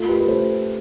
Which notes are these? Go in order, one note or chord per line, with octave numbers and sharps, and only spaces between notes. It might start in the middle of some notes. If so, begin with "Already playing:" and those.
Already playing: A3 F4 A4
G4 B4
B4
A3 A4 C5